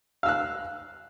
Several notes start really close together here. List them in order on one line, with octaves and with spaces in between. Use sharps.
F5 E6 F#6